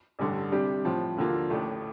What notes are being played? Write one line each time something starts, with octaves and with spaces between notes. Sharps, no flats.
A1 G2 D3
C3 G3 D4 G4
A2 F3 C4
D#2 D3 F3 A#3 F4
A1 A2 A3